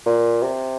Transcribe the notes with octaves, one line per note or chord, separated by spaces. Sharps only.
A#2
C3